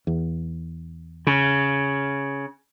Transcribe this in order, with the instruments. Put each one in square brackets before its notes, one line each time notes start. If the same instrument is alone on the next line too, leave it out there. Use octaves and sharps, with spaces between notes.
[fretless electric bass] E2
[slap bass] C#3